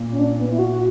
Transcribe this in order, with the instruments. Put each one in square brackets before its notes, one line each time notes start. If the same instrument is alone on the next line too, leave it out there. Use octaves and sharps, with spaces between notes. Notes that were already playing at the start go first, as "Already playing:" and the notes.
Already playing: [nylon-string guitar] A#2
[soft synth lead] C#4
D4
B3
E4
F#4
F#4